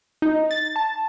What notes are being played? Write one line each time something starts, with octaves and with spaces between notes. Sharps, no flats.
D#4
A6
A5